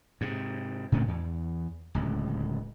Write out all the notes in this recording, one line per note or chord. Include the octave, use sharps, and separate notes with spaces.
G#2 C3
A2 C#3 A3 C4
E2
D1 C#2